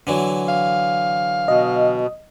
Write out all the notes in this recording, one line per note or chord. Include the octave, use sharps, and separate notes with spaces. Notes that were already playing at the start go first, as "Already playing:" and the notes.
D3 E3 F#3
F5
B2 D#5